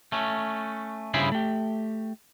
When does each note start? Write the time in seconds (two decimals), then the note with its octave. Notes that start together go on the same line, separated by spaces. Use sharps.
0.12 A3 C#4
1.14 G2 C#3 E4 G#4 C5 B5
1.32 A3 G4